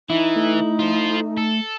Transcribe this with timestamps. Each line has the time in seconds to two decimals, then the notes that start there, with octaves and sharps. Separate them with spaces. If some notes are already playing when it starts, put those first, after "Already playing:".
0.10 E3 D#4 E4
0.36 A3
0.79 F4 C5
1.37 A4